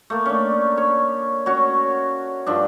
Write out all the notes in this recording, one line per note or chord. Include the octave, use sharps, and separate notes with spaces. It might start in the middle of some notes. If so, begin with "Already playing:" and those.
A3 A#3
C#4 D4
C#5
C#4 F#4 C#5
G2 F3 D4